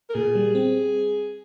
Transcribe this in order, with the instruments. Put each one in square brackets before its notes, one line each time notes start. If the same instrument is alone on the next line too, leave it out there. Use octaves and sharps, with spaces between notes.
[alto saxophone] A#4
[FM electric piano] A#2 [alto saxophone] G#4
[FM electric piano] G3
C4